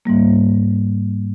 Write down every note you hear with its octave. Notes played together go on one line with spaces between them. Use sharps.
G#2 G3 A#3